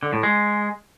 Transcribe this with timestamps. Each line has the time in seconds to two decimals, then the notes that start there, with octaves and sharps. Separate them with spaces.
0.03 D3
0.13 A2
0.23 G#3